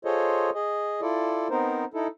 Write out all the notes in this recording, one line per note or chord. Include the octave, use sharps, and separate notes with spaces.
F4 G#4 A4 C5 C#5 D#5
G#4 D#5
E4 F4 A4 D5
B3 C4 D#4 A#4 C5
D#4 E4 A4